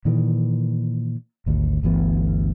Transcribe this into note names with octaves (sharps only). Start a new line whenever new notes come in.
A#2 D#3 E3
G#1 D2
G1 D2 E3 B3